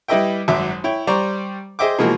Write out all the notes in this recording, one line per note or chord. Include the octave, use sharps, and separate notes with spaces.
G3 E4 B4 D#5 E5 G5
G#1 F#2 F#3 E5 D6
E4 C#5 G5
G3 C5 D5 A#5 C#6
G#4 C5 D#5 E5 G5 D6
B2 E3 F3 G#3 A#3 F#4